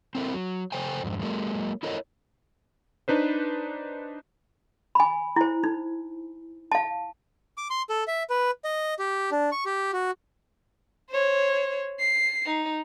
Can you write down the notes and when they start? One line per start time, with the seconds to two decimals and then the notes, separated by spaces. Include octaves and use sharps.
0.15 C4 E4 A4 A#4
0.33 F#3
0.72 C#3 A4 C5 G5 G#5
1.04 F2 G#2
1.21 F#3 G#3 A#3
1.83 E4 A4 A#4 C#5 D#5
3.08 D4 D#4 B4 C5
4.95 G#5 B5
5.36 E4 C5
5.64 D#4
6.72 F5 A5
7.58 D6
7.70 C6
7.90 A4
8.08 E5
8.30 B4
8.65 D#5
8.99 G4
9.31 D4
9.52 C#6
9.66 G4
9.93 F#4
11.09 C5 C#5
11.99 C7
12.45 D#4